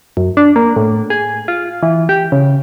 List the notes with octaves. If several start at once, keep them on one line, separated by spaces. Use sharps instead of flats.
F#2
D4
A#3
A2
G#4
F4
E3
G4
C#3